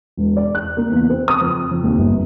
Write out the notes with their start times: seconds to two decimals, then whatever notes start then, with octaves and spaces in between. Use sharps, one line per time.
0.17 E1
0.37 D5
0.55 F#6
0.77 A#3
0.91 E2
1.10 C4
1.28 D#6
1.41 F2
1.71 F2
1.84 D#2
1.99 G1